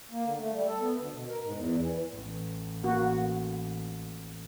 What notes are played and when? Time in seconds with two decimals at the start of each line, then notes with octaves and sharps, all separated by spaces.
0.11 A#3
0.24 D3
0.40 A3
0.52 G3
0.67 A4
0.80 B3
0.95 D2
1.13 B2
1.28 A#4
1.43 G#2
1.55 E2
1.78 E3
2.11 A1
2.83 A#3 F#4